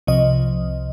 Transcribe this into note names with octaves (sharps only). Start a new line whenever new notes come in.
C2 C3 F3 D#5